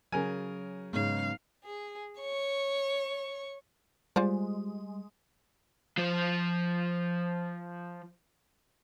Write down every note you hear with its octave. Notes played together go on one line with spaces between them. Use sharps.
C#3 F#3 A#4 G#5
G#2 C#3 B3 D#4 F5
G#4
C#5 C#6
G3 G#3 F4 C5 D5
F3 C5